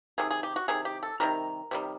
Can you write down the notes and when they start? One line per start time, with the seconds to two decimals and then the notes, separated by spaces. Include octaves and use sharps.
0.18 C3 D#3 G#4
0.31 G#4
0.43 G4
0.56 F#4
0.68 C3 D#3 G#4
0.85 G4
1.03 A4
1.20 C3 D#3 G3 A#4
1.71 C3 D#3 G3